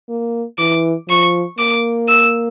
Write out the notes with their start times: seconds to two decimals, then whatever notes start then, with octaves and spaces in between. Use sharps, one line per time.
0.09 A#3
0.58 E3 D6
1.09 F3 C#6
1.58 A#3 D6
2.09 E6